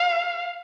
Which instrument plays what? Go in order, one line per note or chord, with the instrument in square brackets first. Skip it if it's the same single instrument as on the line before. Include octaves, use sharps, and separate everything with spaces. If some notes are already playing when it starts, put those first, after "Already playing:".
Already playing: [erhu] F5